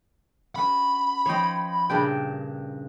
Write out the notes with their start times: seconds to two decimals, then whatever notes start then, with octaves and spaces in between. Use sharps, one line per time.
0.56 C#4 F#4 B4 B5
1.26 F3 D#4 C#5 D#5 G5
1.90 G2 A#2 C#3 D4 G5